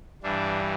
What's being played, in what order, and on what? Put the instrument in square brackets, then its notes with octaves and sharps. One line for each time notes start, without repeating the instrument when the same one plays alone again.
[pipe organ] G2 E3 G3 D4